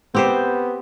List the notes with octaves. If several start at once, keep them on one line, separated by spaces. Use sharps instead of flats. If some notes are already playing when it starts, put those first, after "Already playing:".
B3 C4 G4 C5